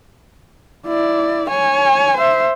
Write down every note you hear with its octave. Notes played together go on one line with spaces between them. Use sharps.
E4 D5
C#5 G#5
C5 E5